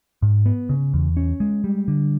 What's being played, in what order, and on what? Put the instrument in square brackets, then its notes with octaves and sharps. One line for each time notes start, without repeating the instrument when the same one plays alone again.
[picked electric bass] G#2
B3
C#3
E2
C#4
G#3
G3
D3